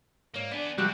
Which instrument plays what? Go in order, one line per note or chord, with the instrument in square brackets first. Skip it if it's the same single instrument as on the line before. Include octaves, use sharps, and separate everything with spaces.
[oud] G#2 C#5 [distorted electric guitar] A#3
[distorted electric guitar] B3 G#4 [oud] D4
[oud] C3 F3 G#3 [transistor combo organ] G3 F#4 [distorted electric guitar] C4 A4